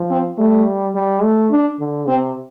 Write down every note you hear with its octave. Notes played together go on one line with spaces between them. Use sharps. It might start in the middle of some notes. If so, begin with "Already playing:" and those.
Already playing: F3
C4
G3 A3
G3
A3
D4
D3
C3 C4